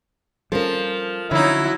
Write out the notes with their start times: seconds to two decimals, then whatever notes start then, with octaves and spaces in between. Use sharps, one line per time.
0.52 F3 G3 B3 C#4 A4 A#4
1.31 D3 F3 F#3 C#4 D#4 E4